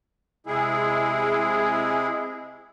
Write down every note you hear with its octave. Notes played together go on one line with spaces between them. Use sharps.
C3 G#3 E4 G#4